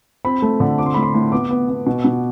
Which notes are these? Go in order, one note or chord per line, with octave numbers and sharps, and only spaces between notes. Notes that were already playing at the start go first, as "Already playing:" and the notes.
C4 B5
A3
D3
C4 D6
C6
A2 B5
C6
A2
B3 D6
B3
B3
B2
B2